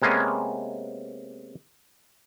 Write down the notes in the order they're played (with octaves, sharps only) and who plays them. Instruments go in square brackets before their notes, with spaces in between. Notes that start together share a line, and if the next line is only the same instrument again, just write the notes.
[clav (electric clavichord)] C3 G#3 A#3 B3 C#4